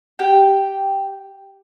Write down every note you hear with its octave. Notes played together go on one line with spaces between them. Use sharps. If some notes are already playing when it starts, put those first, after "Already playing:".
G4 G5